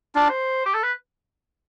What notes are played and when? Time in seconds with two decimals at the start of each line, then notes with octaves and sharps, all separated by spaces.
0.15 D4 F4
0.29 C5
0.66 G4
0.74 A4
0.83 B4